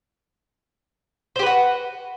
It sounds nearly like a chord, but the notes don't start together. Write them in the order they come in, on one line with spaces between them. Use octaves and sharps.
C5 G4 B4 F#4